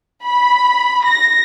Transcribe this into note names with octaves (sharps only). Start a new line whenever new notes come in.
B5
A#6